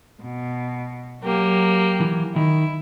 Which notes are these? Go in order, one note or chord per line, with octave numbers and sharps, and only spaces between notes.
B2
F#3 A#3 G4
E3
D#3 E4